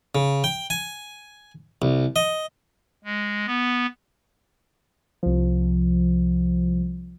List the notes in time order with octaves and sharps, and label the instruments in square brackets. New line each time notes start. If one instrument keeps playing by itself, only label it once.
[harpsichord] C#3
G5
G#5
C2
D#5
[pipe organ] G#3
B3
[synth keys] C2 F3